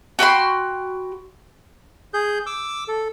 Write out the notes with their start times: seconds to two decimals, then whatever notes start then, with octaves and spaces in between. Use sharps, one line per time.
0.19 F#4 G5 B5 C6
2.14 G#4 G6
2.46 D6 E6
2.88 A4